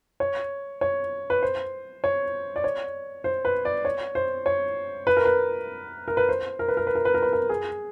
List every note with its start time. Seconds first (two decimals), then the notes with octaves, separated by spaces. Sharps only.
0.20 C#5
0.81 C#5
1.30 B4
1.42 C5
2.04 C#5
2.56 D5
2.64 C#5
3.24 C5
3.45 B4
3.65 D5
3.85 C#5
4.15 C5
4.46 C#5
5.07 B4
5.17 A#4
5.25 B4
6.08 A#4
6.17 B4
6.29 C5
6.59 A#4
6.68 B4
6.77 A#4
6.87 B4
6.95 A#4
7.05 B4
7.14 A#4
7.22 B4
7.33 A#4
7.49 G#4